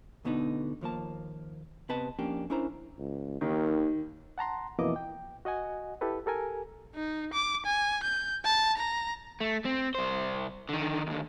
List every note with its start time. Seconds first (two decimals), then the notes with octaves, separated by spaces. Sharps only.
0.25 D2 B2 D3 B3 C4 D#4
0.81 D#2 F3 A#3 A5
1.89 C3 B3 B4 D#5 A5
2.19 F2 A#3 C#4 D4 G4
2.50 C#4 D4 E4 A#4 C5 A#5
2.99 C#2
3.41 D#2 D#3
4.38 F#5 A5 A#5 C6
4.79 F2 B2 E3 A#3 D#5 D6
4.96 G5
5.45 F#4 D#5 F#5 G#5
6.01 E4 G4 A4 B4
6.26 G4 A4 A#4 G#5
6.95 D#4
7.33 D6
7.65 G#5
8.03 G6
8.44 A5
8.77 A#5
9.40 A3
9.65 C4
9.95 C2 C5
10.69 D3 D#3
11.07 D#2 D3